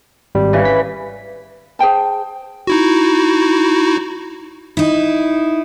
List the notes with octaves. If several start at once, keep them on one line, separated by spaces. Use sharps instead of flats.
G#1 G3
C#3 E3
B6
G#4 C5 G5 A5
D#4 E4 F#4
D#4 E4